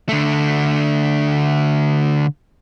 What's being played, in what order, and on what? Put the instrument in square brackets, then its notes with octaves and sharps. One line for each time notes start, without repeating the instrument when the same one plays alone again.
[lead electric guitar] D3 A3